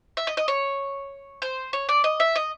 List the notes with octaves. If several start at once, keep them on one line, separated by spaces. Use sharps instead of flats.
E5
D#5
D#5
C#5
C5
C#5
D5
D#5
E5
D#5